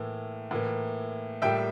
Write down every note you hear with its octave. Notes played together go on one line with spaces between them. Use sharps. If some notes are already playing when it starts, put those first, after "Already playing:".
Already playing: A2 E3 A#3
A2 E3 A#3
A2 G3 A#3 E5 G5